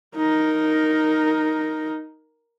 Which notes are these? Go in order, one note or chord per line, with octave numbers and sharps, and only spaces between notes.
D#4 A#4